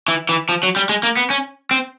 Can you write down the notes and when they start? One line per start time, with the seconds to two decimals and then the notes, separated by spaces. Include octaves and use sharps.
0.08 E3
0.29 E3
0.49 F3
0.63 F#3
0.76 G3
0.89 G#3
1.03 A#3
1.17 B3
1.30 C#4
1.71 C4